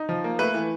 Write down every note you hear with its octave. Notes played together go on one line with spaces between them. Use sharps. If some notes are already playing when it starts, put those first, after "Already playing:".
Already playing: D#4
F3
A#3
A3 B4
E3